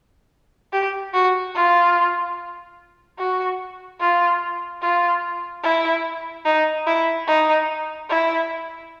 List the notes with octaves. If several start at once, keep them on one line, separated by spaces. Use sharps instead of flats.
G4
F#4
F4
F#4
F4
F4
E4
D#4
E4
D#4
E4